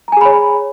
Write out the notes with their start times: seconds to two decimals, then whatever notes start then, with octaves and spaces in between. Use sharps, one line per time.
0.08 A#5
0.12 G#5
0.17 G#4
0.21 B5
0.25 C#5